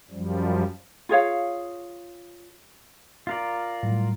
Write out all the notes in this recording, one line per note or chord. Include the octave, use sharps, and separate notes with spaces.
F#2 F3 G3
F4 G#4 C#5 F5
F4 A#4 D5
A2 F#3 G3 A3